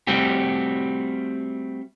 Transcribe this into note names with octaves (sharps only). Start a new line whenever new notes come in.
G3 A3 C4 F#4 G4